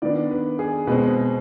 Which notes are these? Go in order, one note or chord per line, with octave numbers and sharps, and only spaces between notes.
D#3 B3 D4 D5
B4
G#4
B2 G#3 C4 B4